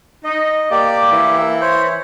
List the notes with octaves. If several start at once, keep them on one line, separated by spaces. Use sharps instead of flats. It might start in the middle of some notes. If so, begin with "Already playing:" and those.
D#4 D#5
A#3 G4 D5
E3
A#3 E6
C5 C#5